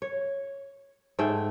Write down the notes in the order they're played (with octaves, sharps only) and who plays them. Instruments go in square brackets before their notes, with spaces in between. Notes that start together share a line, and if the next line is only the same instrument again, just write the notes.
[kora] C#5
G#2 A3 G#4 G5